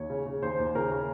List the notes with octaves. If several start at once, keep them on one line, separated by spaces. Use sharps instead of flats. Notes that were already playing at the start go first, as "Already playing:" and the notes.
Already playing: D#2 C#5
C#3
C#3
D#2 C5
D#2
C#3 A#4
C#3